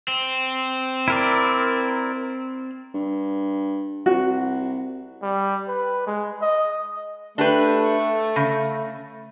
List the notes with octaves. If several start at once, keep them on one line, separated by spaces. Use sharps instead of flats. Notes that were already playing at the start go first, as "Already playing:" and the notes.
C4
E4 A#4 D5
G2
C2 F#4
G3
B4
G#3
D#5
A3 D4 G4 B4
C#3